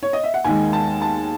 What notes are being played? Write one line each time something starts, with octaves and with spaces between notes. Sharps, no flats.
C#5
D#5
E5
F#5
D#2 D#3 G#3 G#5
A5
A5